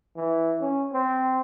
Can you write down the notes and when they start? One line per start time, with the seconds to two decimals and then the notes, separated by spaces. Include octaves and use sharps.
0.16 E3
0.61 C#4
0.93 C4